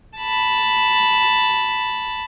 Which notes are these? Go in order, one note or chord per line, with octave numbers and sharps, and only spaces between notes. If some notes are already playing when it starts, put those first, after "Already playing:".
A5 B5